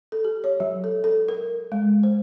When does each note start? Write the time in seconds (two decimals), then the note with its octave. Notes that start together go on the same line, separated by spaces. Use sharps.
0.12 A4
0.25 G4
0.44 C#5
0.60 F#3
0.84 A4
1.04 A4
1.29 A#4
1.72 G#3
2.03 C5